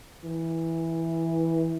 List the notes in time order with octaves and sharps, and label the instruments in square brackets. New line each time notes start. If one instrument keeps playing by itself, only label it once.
[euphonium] E3